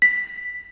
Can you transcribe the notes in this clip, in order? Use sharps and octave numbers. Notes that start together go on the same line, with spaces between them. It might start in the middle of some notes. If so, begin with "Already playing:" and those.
B6